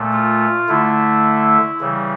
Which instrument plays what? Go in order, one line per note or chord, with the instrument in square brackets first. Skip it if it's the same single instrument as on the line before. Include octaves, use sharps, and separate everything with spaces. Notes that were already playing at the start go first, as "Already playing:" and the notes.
Already playing: [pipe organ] A#2 A3
F4
D3 A3 E4
C#3 E3 G3